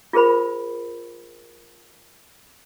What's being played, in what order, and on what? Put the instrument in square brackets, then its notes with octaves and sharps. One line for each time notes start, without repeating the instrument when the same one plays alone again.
[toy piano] F4 G#4 A#4 C5 B5